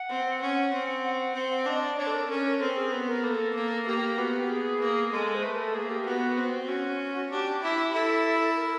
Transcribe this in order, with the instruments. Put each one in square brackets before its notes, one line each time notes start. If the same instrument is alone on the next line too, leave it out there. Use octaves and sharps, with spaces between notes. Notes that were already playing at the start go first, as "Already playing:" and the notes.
Already playing: [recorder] F#5
[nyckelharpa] C4
[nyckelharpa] C#4 [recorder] F#5
[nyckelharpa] C4
[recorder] F#5
[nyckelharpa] C4
[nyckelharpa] D4 [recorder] D#5
[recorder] D5
[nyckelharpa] D4 [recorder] C#5
[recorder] A4
A#4
[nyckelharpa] C#4 [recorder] A#4
[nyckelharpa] C4 [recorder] A4
[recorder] G#4
[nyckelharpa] B3
[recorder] A#4
[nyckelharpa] A#3 [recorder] A4
[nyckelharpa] A#3
[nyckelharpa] A#3 [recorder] G4
[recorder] G4
[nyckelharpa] B3 [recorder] F#4
[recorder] G4
G#4
[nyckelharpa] A#3
[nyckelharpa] G#3 [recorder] A4
[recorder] C5
[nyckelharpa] A3 [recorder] B4
[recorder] A#4
A4
[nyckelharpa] A#3 [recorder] G#4
[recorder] G4
[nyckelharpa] B3 [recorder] F#4
[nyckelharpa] C4
[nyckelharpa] C#4 [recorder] F#4
[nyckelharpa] D4 [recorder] G4
[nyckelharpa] E4
[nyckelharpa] E4 [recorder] A4
[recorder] A#4